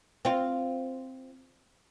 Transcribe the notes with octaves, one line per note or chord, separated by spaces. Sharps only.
C4 F4